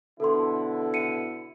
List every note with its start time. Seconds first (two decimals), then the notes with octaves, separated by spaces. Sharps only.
0.20 B2 D3 E4 A4 C6
0.94 C#7 D#7